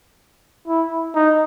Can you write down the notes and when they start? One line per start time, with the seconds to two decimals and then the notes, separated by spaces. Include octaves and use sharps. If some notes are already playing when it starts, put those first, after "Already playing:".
0.68 E4
1.15 D#4